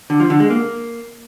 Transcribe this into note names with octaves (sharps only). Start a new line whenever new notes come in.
D3
F3
D3
G#3
A#3